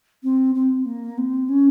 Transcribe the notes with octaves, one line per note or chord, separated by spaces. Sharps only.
C4
C4
A#3
C4
C#4